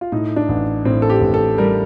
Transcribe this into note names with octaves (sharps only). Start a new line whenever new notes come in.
F4
A2 D#4
D4
A1
A2 C4
A4
G4
A1
A4
G3 A#4